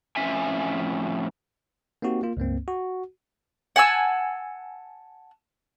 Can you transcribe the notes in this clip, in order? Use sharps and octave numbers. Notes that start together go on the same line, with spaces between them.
F2 A2 C#4 E5 G#5
A#3 C4 D#4 F#4 G4
A#3 F4
C#2 G2 A#3 C4
F#4
F#5 G#5 A5 E6